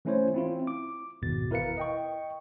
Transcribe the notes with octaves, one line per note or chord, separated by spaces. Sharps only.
E3 A3 C#4 E4 C5 C#5
C4 E4 F4
D6
G#1 E2 B2 A6
E4 A#4 B4 F5 C#7
D#5 G5 C#6